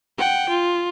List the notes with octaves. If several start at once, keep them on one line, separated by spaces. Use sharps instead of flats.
F#5 G5
F4